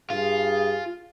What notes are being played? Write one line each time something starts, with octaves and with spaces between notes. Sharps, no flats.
G2 F4 G#4